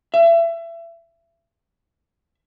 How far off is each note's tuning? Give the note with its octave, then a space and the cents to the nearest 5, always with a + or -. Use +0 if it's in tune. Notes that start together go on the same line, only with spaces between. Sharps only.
E5 +30